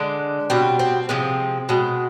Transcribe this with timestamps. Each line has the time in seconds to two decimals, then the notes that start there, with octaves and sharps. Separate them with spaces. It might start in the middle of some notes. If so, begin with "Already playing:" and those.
Already playing: D3 G#3 D4
0.50 B2 G3 C4
0.79 C4
1.09 C3 F3 G#3 C4
1.69 B2 G#3